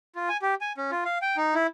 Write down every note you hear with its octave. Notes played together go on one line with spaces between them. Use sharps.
F4
G#5
G4
G#5
C#4
F4
F5
G5
D#4
E4